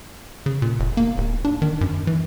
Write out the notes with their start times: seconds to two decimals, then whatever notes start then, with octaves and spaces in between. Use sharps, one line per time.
0.46 C#3
0.62 A#2
0.80 F1
0.97 A#3
1.18 D1
1.45 D4
1.62 D#3
1.81 F#2
2.07 E3